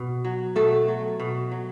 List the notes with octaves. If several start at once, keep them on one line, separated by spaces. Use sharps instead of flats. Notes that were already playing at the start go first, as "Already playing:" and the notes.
Already playing: B2
F#3
B2 A3 A4
F#3
B2
F#3